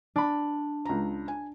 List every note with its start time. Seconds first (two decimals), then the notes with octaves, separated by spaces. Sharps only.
0.16 D4 B5
0.85 C#2 A#5
1.28 G#5